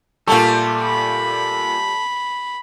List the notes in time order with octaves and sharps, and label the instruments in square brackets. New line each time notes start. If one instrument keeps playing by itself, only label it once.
[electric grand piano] A#2 A5 C#6 [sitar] G3 A3 F4 [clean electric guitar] A4
[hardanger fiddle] B5